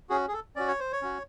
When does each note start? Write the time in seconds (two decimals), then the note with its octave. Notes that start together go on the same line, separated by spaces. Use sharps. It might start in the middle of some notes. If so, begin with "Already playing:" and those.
0.09 C#4 F#4 G#4
0.28 G#4
0.33 A4
0.56 C#4 F#4 D5
0.68 C#5
0.80 C5
0.92 C#5
1.02 C#4 F#4